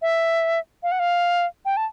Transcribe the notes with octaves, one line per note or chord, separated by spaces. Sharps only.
E5
F5
F#5
F5
G5
A5